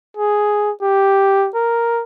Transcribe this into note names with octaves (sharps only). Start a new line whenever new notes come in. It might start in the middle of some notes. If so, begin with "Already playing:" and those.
G#4
G4
A#4